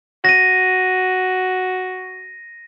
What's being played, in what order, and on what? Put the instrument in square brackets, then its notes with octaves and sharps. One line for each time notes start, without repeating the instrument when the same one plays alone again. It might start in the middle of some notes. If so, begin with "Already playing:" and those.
[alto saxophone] F#4 [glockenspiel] A#6 D#7